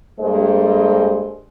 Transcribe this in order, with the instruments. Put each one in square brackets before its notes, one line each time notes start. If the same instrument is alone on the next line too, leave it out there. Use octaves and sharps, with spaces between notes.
[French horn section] G2 G#3 A#3 A4 C5 D#5